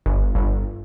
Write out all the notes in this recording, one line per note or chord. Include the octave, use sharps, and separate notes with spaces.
G1
G1